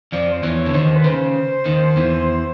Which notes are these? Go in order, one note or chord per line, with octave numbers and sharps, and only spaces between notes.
F2 F3 D5
C5
E2 E3 C#5
D3
D#2 D#3 C5
B4
C#3 C5
D#2 D#3
E2 E3